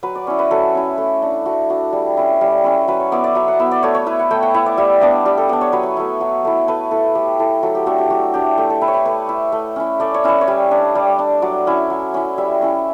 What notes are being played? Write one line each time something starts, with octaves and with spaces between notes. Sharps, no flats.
F#3 B4
D5
C#4 E4 C#5
B4
F#3 A4
C#4 E4
A3
D4
A3 F#4
D4 F#4
G3
C#4 E4
G3
C#4 E4
F#3 B4
C#5
B3 E4 D5
D5
F#3 E5
F#5
B3 E4 E5
D5
A3 C#5
C#5
E4 B4
F#5
A3 G5
F#5
E4 E5
D5
G3 E5
B3 D4 D5
G3 G4
A4
B3 D4 D5
C#5
F#3 B4
C#5
A3 E4
F#3
A3 E4
A3 B4
E4 A4
A3 G4
E4 A4
F#3 A4
G4
A3 D4 F#4
G4
F#3 F#4
A3 D4 G4
A3 G4
A4
E4 B4
C#5
B4
A3 B4
E4
A3
C#4 E4
A3 D5
C#5
C#4 E4 B4
C#5
G3
D4
G3 D5
D4
F#3 D5
C#4 E4
F#3
C#4 E4
G3 E5
C#4 E4